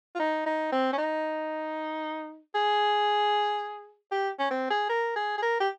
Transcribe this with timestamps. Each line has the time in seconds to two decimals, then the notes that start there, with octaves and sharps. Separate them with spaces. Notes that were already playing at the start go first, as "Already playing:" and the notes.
0.15 F4
0.19 D#4
0.46 D#4
0.72 C4
0.92 C#4
0.98 D#4
2.54 G#4
4.11 G4
4.39 C#4
4.51 C4
4.70 G#4
4.89 A#4
5.16 G#4
5.37 G#4
5.42 A#4
5.60 G4